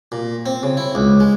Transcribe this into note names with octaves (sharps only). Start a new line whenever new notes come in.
A#2
C4
C#3
E4
C#2
G#3